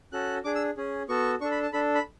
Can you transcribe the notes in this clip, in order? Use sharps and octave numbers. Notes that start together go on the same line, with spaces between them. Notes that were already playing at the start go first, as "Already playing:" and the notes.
C#4 F#4 A4 F#6
D4 G#4 D6
E6
C#4 G#4
B3 F#4 A4 C#6
D4 A4 C#6
B5
A5
D4 A4 B5
B5